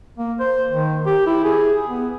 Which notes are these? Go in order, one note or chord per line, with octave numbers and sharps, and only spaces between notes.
A#3
C5
D#3
G4
E4
G#4
B3